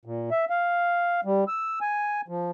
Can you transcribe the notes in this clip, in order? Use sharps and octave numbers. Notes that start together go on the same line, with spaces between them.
A#2
E5
F5
G3
E6
G#5
F3